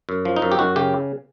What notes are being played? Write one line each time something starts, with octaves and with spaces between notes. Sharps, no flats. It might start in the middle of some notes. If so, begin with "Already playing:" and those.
F#2
F3
D#4
F#2
G4
F#2 F#4
C#3 G4